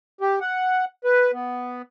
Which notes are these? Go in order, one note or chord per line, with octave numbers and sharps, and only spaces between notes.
G4
F#5
B4
B3